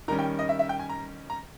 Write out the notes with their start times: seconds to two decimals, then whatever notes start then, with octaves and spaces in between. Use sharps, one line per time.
0.08 D#3 G3 C#4 A#5
0.19 G5
0.39 D#5
0.49 E5
0.59 E5
0.69 G5
0.80 G#5
0.90 A#5
1.30 A#5